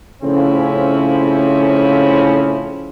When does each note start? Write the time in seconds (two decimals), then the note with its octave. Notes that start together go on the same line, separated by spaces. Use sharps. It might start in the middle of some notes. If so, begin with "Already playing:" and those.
0.23 A2 C#3 F3 C4 C#4 E4